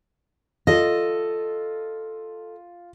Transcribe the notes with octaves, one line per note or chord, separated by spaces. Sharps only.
F4 A4 D#5